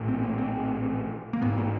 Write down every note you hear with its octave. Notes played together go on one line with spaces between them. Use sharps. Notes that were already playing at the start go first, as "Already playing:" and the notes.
Already playing: A#1 A2
C4
A#3
C4
A#3
A1 G#2 B3
A#3